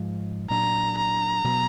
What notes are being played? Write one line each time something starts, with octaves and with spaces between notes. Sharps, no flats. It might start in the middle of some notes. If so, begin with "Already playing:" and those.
Already playing: G#2 F3 G#3
A#2 F#3 D4 A#5
A#5
B2 F#3 B3